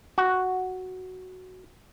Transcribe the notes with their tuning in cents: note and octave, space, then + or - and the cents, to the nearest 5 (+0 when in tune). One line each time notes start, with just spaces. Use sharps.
F#4 +0